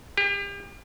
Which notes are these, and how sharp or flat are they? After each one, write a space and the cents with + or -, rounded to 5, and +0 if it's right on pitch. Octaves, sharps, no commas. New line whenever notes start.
G4 +40